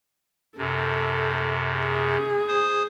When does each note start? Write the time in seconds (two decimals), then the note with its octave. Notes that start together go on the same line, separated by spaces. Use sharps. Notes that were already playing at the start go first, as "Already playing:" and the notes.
0.58 F#2 C3 A4
1.77 G#4
2.48 C5 D#6